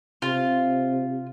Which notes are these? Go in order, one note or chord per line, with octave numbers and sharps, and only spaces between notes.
C3 F4